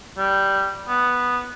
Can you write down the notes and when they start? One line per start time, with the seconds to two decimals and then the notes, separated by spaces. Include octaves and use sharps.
0.18 G3
0.88 B3